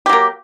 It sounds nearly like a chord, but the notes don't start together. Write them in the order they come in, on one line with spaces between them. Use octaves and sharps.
G4 F#3 A#3